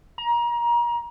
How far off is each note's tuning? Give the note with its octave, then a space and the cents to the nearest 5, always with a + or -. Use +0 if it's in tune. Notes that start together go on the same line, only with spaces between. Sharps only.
A#5 +30